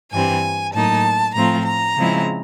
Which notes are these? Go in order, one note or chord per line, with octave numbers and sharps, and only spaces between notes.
G2 E3 G3 C4 G#5
A2 F#3 A#3 D#4 A5
A2 F3 A3 C4 F4 A#5
A#5
C#3 F3 G#3 C4 E4